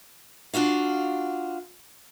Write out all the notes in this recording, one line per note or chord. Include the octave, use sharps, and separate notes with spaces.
D4 F4 F#4 F5